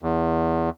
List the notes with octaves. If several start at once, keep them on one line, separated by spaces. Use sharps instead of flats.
E2